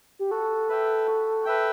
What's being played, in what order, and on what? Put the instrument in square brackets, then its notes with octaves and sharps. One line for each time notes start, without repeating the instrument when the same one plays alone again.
[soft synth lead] G4
[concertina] F#4 [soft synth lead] A4
[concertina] B4 E5 G5
F#4
B4 E5 G5